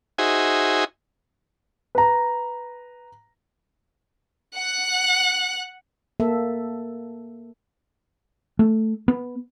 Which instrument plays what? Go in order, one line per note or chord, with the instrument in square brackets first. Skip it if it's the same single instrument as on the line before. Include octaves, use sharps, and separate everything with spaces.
[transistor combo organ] D#4 F#4 G#4 C5 E5 G#5
[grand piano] B4 A#5
[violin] F#5 F#6
[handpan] A#3 A4 E5
[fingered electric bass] A3
B3